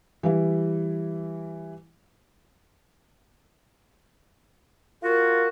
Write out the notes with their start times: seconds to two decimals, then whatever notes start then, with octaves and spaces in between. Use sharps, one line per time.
0.23 E3 G3 E4
5.03 F4 F#4 A#4